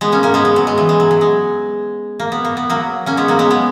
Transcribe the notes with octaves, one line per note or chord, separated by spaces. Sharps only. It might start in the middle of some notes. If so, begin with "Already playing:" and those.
G#3 B3
A#3 C#4
A#3 C#4
G#3 B3
G#3
F#3
G#3
E3
G#3
F#3
F#3
G#3
A#3
B3
A#3
B3
F#3 A#3
A#3 C#4
G#3 B3
F#3 A#3
G#3 B3
G#3 B3